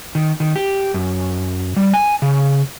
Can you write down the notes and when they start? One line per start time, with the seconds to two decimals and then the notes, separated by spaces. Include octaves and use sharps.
0.15 D#3
0.40 D#3
0.56 G4
0.94 F#2
1.76 G3
1.93 G#5
2.22 C#3